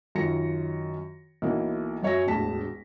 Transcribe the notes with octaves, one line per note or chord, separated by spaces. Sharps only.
F#2 D#3 F4 A#6 C#7
B1 E3 A#3
F#2 F#3 C#5 E5 G#5 A#6
E1 A1 D2 A5 B6